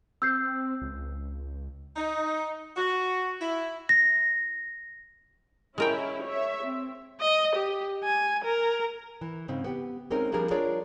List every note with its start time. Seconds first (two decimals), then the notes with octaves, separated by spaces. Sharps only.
0.22 C4 E6 G6 C7
0.82 C#2
1.96 D#4
2.76 F#4
3.40 E4
3.89 A#6
5.78 G#3 C#4 E4 A#4 G5
6.25 C#5 E5
6.64 C4
7.21 D#5
7.56 G4
8.04 G#5
8.44 A#4
9.21 E3
9.48 G#2 C#3 C4 D#4
9.64 B3 G4
10.11 G#3 A#3 C4 C#4 D#4 A#4
10.32 F3 G3 A#3 D4 G#4 A#4
10.51 D4 F4 G#4 A#4 C#5 D5